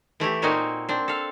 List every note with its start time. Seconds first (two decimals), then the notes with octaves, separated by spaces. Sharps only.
0.20 E3 A3 E4 G4
0.42 A#2 A#3 C4 D#4 F#4 G#5
0.89 C4 D4
1.08 A4 F5